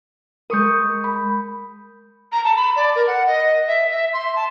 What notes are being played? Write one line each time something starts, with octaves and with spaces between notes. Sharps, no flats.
G#3 A#4 C#6 D#6 G6
B5
A#5
A5
B5
D5
A#4
F#5
D#5
E5
E5
C6
A5